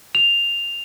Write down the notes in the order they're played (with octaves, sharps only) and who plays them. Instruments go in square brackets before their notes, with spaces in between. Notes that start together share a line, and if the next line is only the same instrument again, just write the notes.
[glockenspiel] F7